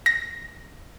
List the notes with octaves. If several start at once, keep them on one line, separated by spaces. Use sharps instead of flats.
A#6